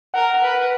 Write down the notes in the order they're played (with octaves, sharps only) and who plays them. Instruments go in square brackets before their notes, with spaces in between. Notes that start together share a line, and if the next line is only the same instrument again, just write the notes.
[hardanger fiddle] A#4 [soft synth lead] F#5
[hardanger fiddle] B4